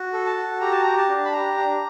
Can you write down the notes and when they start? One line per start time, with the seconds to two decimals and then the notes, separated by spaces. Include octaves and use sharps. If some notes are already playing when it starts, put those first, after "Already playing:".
Already playing: F#4
0.13 A4
0.26 A5
0.37 F#4
0.61 G4 A#5
0.71 A5
0.82 G4 A#5
0.98 A5
1.09 D4
1.25 B5
1.32 G4 A#5
1.57 D4